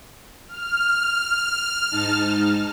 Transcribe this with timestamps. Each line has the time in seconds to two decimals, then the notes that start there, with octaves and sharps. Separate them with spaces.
0.48 F6
1.91 G#2 D#4 A5